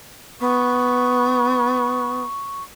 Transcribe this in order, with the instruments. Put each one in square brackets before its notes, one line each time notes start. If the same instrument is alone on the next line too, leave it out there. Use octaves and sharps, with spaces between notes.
[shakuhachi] B3 [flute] C#6